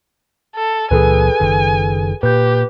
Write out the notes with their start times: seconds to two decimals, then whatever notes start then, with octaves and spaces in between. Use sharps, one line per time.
0.56 A4
0.91 C#2 A#2 E3 G#4 A4 B4 G#5
1.40 F#1 D#3
2.23 A#2 G4 B4 G6